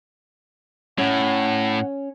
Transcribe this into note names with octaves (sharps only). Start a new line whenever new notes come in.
A2 C#4 F#5